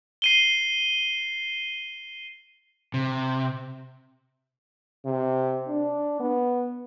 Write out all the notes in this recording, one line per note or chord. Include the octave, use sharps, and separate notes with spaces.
C7 D#7 G7
C3
C3
D4
B3